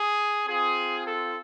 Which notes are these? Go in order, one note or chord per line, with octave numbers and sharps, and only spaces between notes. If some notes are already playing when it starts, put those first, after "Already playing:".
Already playing: G#4
C4 F4 G#4
A4